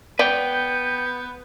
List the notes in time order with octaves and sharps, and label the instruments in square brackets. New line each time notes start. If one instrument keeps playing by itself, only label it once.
[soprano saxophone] B3 [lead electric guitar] B4 G5 [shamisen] D5 [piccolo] G6